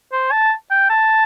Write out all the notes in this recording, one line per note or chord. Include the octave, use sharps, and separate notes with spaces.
C5
A5
G5
A5